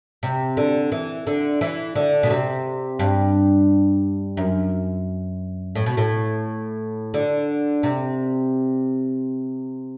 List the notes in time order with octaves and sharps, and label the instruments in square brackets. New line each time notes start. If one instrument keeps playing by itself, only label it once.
[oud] C3
D3
E3
D3
E3
D3
B2
C3
G2
F#2
A2
B2
A2
D3
C3